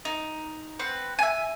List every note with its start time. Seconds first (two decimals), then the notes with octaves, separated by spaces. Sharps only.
0.05 D#4
0.79 C4 B4 F#5
1.19 E5 G#5